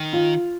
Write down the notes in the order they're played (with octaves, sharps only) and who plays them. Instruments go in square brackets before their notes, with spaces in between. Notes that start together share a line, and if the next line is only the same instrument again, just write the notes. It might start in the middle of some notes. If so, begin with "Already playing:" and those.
Already playing: [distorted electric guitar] D#3
[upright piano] F4